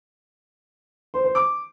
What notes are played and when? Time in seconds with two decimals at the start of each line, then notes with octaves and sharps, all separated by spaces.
1.14 C5
1.24 C5
1.35 D6